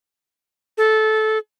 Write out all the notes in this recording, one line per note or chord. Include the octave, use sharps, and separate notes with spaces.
A4